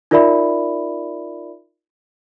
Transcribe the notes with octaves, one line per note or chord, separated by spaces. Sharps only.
D#4 F4 A#4 D5 E5 B5